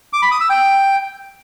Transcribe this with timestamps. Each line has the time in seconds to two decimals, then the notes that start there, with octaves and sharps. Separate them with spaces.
0.13 D6
0.22 B5
0.31 D#6
0.41 E6
0.50 G5